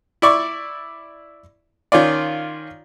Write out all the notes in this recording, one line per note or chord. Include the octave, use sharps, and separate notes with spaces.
E4 D5 C#6 D6
D#3 C#4 F4 D5